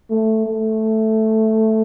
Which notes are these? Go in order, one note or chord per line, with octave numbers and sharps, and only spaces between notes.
A3
A3